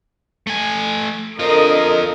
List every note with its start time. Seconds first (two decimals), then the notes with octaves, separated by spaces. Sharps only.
0.47 A3 G#5
1.39 D3 C4 F4 A#4 D#5